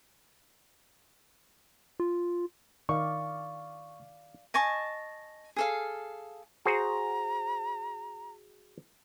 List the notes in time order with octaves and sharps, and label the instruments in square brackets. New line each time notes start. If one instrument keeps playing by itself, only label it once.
[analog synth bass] F4
[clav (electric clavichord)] D#3 [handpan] D5 F5 [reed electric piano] C#6
[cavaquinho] D#5 G#5 A5 C#6
G#4 A4 F5
[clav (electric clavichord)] F#4 G#4 C5 [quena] A#5